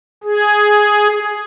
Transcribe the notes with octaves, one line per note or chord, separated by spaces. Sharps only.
G#4